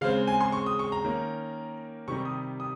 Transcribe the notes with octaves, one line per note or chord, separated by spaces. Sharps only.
C#3 G#3 C4 F5
G#5
C6
C#6
D#6
C#6
A#5
D#3 A#3 C#4
C3 D#3 G3 C#6
D#6
D#6